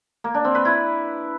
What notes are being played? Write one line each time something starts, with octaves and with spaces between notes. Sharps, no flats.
A#3
D4
C4
B4
E4